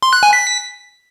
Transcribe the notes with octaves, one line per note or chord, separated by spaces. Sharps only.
C6
F#6
G#5
B6